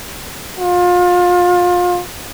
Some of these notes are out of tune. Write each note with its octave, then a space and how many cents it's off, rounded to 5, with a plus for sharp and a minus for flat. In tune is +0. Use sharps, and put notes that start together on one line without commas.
F4 +30